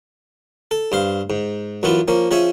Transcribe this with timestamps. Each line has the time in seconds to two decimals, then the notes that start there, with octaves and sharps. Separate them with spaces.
0.71 A4
0.92 G2 C5 F5
1.30 G#2
1.83 F#2 E3 B3 E4 F4
2.08 F3 A#3 C#4
2.31 F3 C#4 G#4 C#5 E5